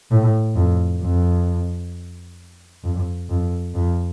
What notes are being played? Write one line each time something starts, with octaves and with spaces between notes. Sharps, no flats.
A2
F2
F2
F2
F2
F2